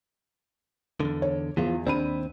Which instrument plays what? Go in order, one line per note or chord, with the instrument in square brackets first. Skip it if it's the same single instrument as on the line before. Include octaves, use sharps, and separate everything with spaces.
[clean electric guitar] E2 G2 D3
[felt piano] C#5
[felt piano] E2 [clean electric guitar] E3 F3 F4
[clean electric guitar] D#2 C4 [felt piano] D4 B5 D#7